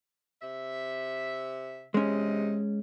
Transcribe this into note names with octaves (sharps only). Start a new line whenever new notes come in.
C3 E5
E2 C3 G#3 C#4 D#5